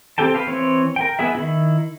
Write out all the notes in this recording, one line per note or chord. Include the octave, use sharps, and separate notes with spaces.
C4 G4 A4 G5 A5
B4 F5
E3 C4 C#5
A#4 G5
B3 E4 G#4 E5
D#3 E4